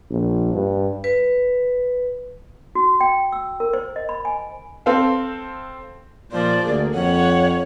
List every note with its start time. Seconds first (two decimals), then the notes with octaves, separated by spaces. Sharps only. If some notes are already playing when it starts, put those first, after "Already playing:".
0.11 A#1
0.54 G2
1.04 B4
2.75 F#4
3.01 G5
3.32 E6
3.60 A#4
3.73 C5
3.96 D#5
4.09 B5
4.25 G#5
4.86 C4 A4 C5 F5
6.32 A#2 F3 C5 D5
6.65 D2 A#3 G#4
6.94 F2 C#5 F#5